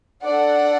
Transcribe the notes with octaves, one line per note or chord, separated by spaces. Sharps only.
D4 A4 D5 F#5